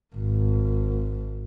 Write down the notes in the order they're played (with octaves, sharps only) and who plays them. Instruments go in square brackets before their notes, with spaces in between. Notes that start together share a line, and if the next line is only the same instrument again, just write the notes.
[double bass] G#1